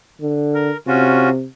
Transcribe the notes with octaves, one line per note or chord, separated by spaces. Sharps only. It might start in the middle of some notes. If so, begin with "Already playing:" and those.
D3
A#4
C3 C#4 F4 F#4